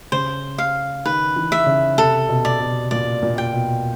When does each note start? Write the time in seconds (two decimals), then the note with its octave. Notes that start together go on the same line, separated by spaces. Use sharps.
0.12 C#3 C5
0.58 F5
1.06 D#3 B4
1.36 E3
1.52 E5
1.67 C#3
1.98 C3 A4
2.29 B2
2.45 D5
2.61 B2
2.91 A#2 D5
3.23 A#2
3.38 G5
3.53 B2